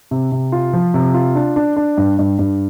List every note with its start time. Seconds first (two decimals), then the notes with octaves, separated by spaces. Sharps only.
0.11 C3
0.32 C3
0.52 F4
0.73 F3
0.94 C3
1.14 F4
1.35 D4
1.56 D4
1.77 D4
1.97 G2
2.19 G2
2.39 G2